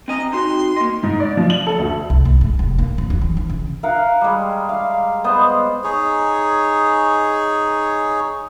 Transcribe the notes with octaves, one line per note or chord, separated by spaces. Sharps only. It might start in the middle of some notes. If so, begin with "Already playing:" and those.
C4 D#5 G#5 A#5
C4 D#4 F#4 C6
A#3 D#5
G#2
D5
F3
F#7
A4
D2
C2
A3
G#2
F1
A#3
F2
F#3
E3
E3
C#3
A#4 F5 F#5
G3 G#3
F5
B3 C5 D#5
D#4 G#4 C#5